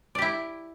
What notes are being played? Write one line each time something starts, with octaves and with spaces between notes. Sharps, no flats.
E4 G4 D5